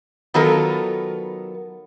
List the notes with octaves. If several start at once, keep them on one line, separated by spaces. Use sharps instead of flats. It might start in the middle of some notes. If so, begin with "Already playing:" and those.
D#3 F#3 B3 F4 A4 A#4